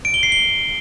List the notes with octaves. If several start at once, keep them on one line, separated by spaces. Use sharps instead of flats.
D7
G7
C7
G7